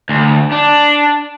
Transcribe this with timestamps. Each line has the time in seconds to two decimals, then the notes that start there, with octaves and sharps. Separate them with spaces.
0.09 D2
0.52 D4